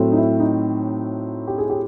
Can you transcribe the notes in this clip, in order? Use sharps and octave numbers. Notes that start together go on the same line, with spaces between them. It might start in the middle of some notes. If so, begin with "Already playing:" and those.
Already playing: A2 F#3 A3 C4
D#4
E4
D#4
G4
G#4
G4